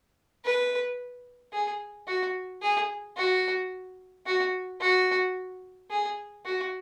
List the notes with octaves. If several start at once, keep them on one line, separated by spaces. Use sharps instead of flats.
B4
G#4
F#4
G#4
F#4
F#4
F#4
G#4
F#4